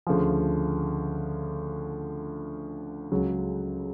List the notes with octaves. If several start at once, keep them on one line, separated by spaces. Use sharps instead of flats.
D2 C#3 F3
C#2 C#3 F#3